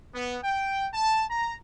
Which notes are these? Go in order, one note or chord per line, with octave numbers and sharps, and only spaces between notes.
B3
G5
A5
A#5